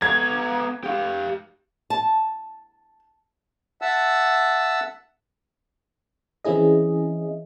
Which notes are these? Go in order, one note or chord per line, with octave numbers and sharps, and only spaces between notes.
B3 A#5 G#6
G4 F5
A5
E5 F#5 A5 E6
E3 C4 C#4 E4 G#4 D#5